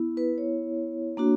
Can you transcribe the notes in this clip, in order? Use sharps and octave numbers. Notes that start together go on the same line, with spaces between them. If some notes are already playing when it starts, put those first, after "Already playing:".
Already playing: B3 E4
B4
C#5
A#3 D4 F#4